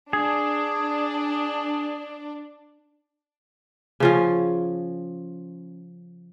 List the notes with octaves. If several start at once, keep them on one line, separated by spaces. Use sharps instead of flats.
D4 G#4
C#3 F3 C#4